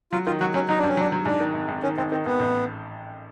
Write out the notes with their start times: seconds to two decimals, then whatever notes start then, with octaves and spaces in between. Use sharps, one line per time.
0.12 F#3 F4
0.26 D#3 F4
0.40 F#3 F#4
0.54 F#3 C#4
0.69 F#3 D#4
0.79 G2 D4
0.89 C#4
0.97 F#3 D4
1.12 F#3
1.25 G#2 D4
1.40 D#3
1.54 G#1
1.68 G#1
1.83 D#3 C#4
1.97 G#1 C4
2.11 D#3 C4
2.26 G#1 B3
2.39 A1